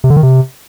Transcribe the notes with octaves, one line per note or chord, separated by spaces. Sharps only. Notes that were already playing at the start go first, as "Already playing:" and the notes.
C3
D3
D#3
C3